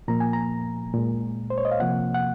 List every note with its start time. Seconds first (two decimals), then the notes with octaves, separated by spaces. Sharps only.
0.08 A#2 F3 A#3 A#5
0.20 G#5
0.33 A#5
0.94 A#2 G#3
1.50 C5
1.58 C#5
1.65 D#5
1.71 F5
1.80 C3 F3 A#3 F#5
2.14 F#5